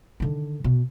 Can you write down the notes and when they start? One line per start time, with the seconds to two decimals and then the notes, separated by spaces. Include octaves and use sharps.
0.20 D3 D#3
0.64 B2